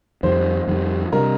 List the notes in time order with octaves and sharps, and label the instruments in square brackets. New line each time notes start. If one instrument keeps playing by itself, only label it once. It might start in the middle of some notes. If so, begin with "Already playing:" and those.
[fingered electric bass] F2 D#3 G3 [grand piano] C5
[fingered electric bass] F2 D#3 G3
[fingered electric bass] C3 G3 D4 [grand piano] A#4